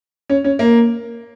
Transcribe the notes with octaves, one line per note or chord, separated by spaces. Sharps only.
C#4
C#4
A#3